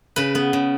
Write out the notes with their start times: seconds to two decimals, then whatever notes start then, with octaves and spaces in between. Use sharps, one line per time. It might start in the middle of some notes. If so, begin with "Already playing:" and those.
0.16 C#3 B4
0.35 B3
0.53 C#3